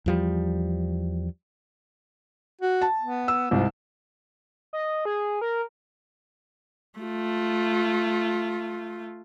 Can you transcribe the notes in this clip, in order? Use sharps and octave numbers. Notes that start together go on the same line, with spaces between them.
E2 F3 G3
F#4
A5
B3
E6
C2 G#2 F4
D#5
G#4
A#4
A3 F4